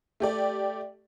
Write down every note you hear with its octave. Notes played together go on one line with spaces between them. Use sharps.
A3 G4 D5